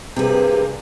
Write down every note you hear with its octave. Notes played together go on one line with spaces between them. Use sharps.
G2 C3 A#3 C4 G#4 B4